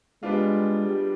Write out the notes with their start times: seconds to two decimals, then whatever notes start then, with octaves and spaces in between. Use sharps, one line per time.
0.23 G3 G#3 B3 D4 F4
0.84 G3